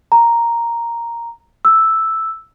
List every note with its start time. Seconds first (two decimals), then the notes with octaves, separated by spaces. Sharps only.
0.12 A#5
1.65 E6